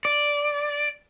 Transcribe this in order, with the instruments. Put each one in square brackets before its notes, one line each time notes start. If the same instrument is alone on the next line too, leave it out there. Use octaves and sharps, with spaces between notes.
[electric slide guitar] D5